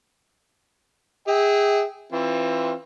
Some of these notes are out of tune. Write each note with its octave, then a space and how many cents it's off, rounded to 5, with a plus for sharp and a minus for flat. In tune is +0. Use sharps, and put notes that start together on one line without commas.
G#4 -20 E5 -30 G5 -15
E3 +0 C4 +30 F4 +0